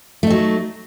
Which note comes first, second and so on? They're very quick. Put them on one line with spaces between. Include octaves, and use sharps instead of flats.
A3 D#4 F#3